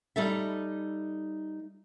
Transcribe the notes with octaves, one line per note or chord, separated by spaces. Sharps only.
G3 D#4 A4 E5